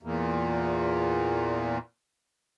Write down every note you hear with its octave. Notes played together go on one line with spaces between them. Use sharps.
E2 A#2